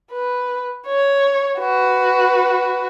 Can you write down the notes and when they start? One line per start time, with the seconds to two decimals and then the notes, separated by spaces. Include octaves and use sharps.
0.12 B4
0.87 C#5
1.59 F#4 B4